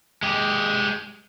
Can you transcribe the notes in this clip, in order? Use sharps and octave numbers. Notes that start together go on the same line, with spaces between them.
G#3 G4